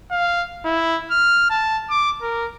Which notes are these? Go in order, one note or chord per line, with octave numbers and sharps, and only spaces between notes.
F5
E4
F6
A5
D6
A#4